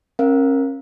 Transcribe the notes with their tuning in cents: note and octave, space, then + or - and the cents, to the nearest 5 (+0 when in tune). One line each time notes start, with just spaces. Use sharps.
C#4 -35 A#4 +0 F5 -5